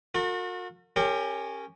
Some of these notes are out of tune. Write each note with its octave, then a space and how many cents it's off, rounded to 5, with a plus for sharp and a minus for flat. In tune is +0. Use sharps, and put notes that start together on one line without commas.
F#4 -40 A#4 -45
C#4 +0 G4 +25 A#4 -20